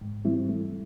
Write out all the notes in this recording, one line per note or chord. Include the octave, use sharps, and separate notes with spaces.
G#2
E3 G3 C4 E4
A3